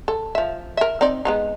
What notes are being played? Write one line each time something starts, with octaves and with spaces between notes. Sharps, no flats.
A4
F3 E5
A#4 E5
C4 D#4 D5
G#3 B3 D#4